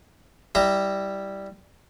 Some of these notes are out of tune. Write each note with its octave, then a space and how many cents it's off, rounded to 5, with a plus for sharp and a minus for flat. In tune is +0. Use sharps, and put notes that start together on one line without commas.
G3 +0 E4 -15 A#5 -15